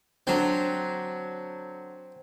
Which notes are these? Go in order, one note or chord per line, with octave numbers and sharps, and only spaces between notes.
D3 F#3 C4